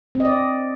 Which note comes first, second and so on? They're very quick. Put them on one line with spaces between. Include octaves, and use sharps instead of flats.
C4 D#5 D5